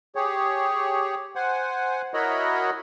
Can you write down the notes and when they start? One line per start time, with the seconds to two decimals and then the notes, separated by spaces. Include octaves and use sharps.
0.16 G4 G#4 C#5
1.36 C5 F#5 G#5
2.14 E4 F#4 A#4 C#5 D#5 B5